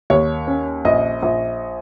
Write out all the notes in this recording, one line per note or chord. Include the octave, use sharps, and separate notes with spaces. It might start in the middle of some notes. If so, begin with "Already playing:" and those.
D#2 C#5
C#4
A#1 D#5
A#1